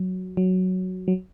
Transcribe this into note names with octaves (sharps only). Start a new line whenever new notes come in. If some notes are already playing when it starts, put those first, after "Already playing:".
Already playing: F#3
F#3
F#3